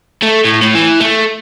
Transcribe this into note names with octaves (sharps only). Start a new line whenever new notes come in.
A3
A2
A2
E3
A3